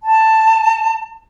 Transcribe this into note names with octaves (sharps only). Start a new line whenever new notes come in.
A5